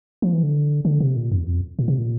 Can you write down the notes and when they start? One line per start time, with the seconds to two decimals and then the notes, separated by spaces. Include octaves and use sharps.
0.22 F3
0.33 E3
0.43 D3
0.85 D3
1.00 C3
1.16 A#2
1.32 F2
1.40 E2
1.47 F2
1.79 A#2
1.88 C3
1.98 A#2